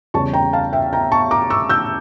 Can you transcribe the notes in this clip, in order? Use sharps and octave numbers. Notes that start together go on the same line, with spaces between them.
E2 C#3 G3 A5 C#6
G5 A#5
F5 A5
E5 G5
G5 A#5
A5 C#6
A#5 D6
C#6 E6
E6 G6